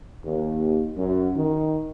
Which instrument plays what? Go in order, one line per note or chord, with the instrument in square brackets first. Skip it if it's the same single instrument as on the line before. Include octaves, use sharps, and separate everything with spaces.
[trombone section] D#2
F#2
D#3